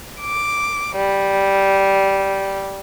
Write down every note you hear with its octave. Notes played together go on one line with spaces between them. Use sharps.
D6
G3